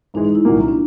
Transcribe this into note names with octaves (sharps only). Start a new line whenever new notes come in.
G#2 E3 G#3 D#4
D#4
E4
C2 A#2 F#3 A#3
C#4
D4